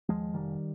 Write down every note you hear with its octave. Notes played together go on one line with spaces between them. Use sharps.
D#2 F3 G#3
F1 D#3 G3